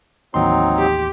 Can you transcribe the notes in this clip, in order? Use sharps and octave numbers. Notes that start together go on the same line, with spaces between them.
A1 D#2 F#3 C4 D#4 C6
G4